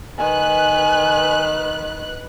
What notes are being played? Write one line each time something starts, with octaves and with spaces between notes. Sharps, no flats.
D#3 B4 G#5 F#6